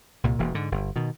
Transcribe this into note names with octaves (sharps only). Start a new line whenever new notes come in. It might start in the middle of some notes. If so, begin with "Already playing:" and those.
C2 A#2
E1 E3 A#3
G#2 D3
G1
B2 D#3